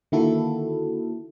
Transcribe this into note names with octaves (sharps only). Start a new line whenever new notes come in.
D3 D#3 A#3 E4 F#4 A4